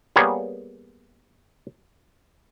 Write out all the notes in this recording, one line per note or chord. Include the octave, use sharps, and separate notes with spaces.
G3 A#3 B3 G#4 C#5